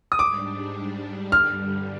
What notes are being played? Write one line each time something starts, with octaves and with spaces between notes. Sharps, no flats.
D#6
G#2 G3 D4 D6
G2 D3 G3 F6